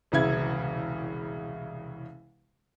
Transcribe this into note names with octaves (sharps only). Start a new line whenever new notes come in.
E1 C2 C#3 E4 G#6